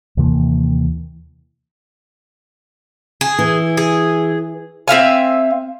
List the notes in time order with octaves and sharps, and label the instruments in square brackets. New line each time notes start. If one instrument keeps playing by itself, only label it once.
[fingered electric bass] D#2 C3 E3 A#3
[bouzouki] G#4
[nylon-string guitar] E3
[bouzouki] G#4
C4 E5 F5 G#5